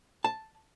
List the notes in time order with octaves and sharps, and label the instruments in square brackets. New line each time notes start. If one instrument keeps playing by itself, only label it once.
[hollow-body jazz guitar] A5